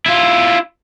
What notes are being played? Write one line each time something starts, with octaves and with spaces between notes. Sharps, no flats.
E4 F4